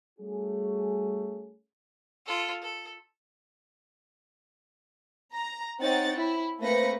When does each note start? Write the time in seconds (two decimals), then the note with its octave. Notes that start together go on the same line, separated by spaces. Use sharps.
0.19 G3 A3 C#4 F#4 G#4
2.26 F4 A4
2.63 A4
5.34 A#5
5.82 C4 D#4 C#5 F#5 G5 A6
6.16 E4
6.59 A3 A#3 C4 B4 A#6 C#7